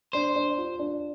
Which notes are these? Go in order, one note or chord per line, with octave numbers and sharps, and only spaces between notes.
D4 C5
D4
F4
D4